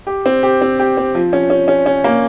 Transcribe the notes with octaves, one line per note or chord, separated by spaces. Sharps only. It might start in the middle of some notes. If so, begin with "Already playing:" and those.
G4
C4
G4
C4
G4
C4
F3
C#4
C#4
C#4
C#4
A#3